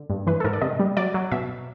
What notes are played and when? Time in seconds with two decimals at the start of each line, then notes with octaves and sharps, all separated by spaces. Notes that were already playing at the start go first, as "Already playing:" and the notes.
Already playing: D3
0.10 G2
0.27 E3 B4
0.40 A4
0.44 G#2 A#4
0.53 D5
0.62 C3 D#5
0.79 G3
0.97 F#3 D5
1.14 F#3
1.32 B2 E5